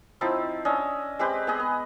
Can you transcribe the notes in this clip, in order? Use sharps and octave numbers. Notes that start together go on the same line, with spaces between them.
F3 C4 D#4 E4
C#4 D4 D#5 E5
G#3 C4 G4 B4
B3 G#4 D#5
B3